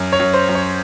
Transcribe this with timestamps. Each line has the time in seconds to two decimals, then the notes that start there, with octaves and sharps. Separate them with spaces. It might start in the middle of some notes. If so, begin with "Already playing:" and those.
Already playing: F#2
0.13 C#5
0.20 F#2
0.34 C5
0.49 F#2
0.55 C#5